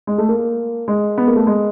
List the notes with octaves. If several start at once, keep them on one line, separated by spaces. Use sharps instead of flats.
G#3
A3
A#3
G#3
B3
A#3
A3
G#3